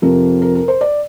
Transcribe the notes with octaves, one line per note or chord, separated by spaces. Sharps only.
F2 C3 F3 A#4
A#4
A#4
C5
D5